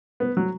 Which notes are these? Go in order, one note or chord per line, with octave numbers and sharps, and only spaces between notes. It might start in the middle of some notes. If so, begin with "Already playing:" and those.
B3
F#3